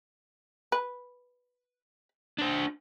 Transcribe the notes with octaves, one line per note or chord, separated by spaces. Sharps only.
B4
D4 C5